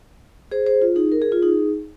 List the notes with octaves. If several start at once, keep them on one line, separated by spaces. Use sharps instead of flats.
G#4 C5
G#4 C5
F4
D#4 G#4
A#4
G#4
F4
D#4 G#4